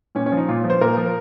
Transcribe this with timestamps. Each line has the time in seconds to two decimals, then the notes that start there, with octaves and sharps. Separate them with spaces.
0.15 A#2 C#4
0.26 C#4
0.32 F3
0.37 D#4
0.48 A#2 F4
0.64 F3
0.70 C5
0.81 A#2 A#4
0.97 F3